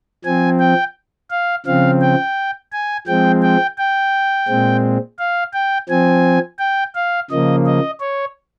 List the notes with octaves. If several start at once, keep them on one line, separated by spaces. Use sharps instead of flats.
F3 C4 G#5
G5
F5
C#3 F3 C4 F5
G5
G#5
F3 G#3 C4 G5
G5
G5
A#2 G#3 C4
F5
G5
F3 C4 G#5
G5
F5
C#3 F3 A#3 D#5
D#5
C#5